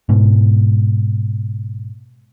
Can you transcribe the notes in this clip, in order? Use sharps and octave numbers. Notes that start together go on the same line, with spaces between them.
G#2 B2